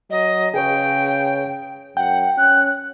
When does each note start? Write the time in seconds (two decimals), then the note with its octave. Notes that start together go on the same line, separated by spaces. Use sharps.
0.10 F#3 D#5
0.54 C#3 G#4 B4 C#5 G5
1.97 F#2 F#5 G5
2.37 C#4 F#6